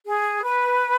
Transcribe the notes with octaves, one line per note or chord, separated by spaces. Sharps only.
G#4
B4